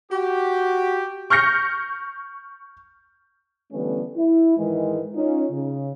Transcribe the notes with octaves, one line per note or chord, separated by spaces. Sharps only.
F#4 G4
C#6 F6 G6 A#6 C#7
D3 E3 G3 A3 B3 C#4
E4
G#2 D#3 E3 G#3
C#4 D#4 F4
C#3